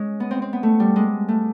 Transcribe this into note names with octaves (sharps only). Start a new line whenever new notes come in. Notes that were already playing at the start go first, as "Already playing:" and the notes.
Already playing: G#3 C#4
B3
C4
C4
B3
A3
G3
G#3
A3